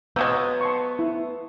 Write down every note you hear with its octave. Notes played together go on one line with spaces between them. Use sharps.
F3 F#3 G#3 B3 A#5 D6 E6
A5 C6 C#6
E4